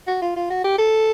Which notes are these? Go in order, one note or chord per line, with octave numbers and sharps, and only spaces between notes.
F#4
F4
F4
F#4
G4
A4